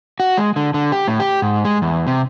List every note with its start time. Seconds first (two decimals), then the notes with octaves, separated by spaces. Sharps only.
0.20 F#4
0.38 G#3
0.56 D3
0.74 D3
0.92 G4
1.08 A2
1.20 G4
1.42 G#2
1.65 G#3
1.82 E2
2.07 C3